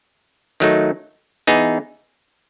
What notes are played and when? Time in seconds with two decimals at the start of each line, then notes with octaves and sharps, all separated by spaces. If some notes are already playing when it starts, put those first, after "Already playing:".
0.60 D#3 F#3 A3 D#4
1.47 E3 B3 D#4 G#4